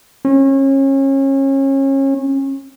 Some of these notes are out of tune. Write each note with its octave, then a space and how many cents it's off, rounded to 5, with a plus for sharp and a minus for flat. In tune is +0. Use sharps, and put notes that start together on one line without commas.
C#4 -30